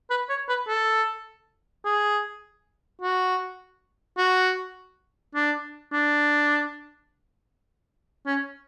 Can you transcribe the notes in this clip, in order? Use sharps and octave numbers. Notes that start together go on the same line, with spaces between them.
B4
C#5
B4
A4
G#4
F#4
F#4
D4
D4
C#4